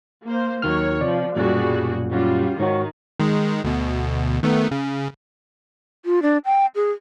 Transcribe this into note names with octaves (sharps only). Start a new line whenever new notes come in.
A#3 C5
D#2 D#3 F#3 C#5 F6
C3 F3 D5
B1 F#2 A#2 F#3 G3 F#4 G#4 D5
G3 C#4 F4 F#4
G#2 D#3 F#4 C#5
D#3 G#3
D2 B2
D#3 A3 B3
C#3
F4
D4
G5
G#4